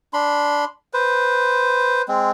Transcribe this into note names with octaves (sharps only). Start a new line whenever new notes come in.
D4 B5 C6
B4 C5
G#3 C4